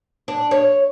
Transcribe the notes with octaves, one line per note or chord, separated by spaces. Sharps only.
D4
C#5